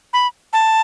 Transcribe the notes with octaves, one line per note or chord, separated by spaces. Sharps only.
B5
A5